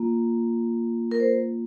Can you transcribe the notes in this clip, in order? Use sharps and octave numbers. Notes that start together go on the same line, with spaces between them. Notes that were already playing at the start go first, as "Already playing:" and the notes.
Already playing: A#3 F4
A#4
C5